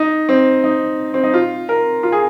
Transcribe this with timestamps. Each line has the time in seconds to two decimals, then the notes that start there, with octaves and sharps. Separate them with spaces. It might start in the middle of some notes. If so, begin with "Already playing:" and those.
Already playing: D#4
0.29 C4
0.64 D#4
1.14 C4
1.23 D#4
1.34 F4
1.69 A#4
2.03 F4
2.12 G#4